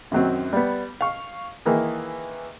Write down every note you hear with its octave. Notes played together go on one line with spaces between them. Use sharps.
F#2 D#3 F#3 C4
G3 B3
F5 C#6
D#3 E3 A#3 G#4